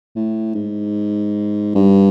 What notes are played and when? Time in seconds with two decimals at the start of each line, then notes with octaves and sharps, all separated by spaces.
0.16 A2
0.55 G#2
1.75 G2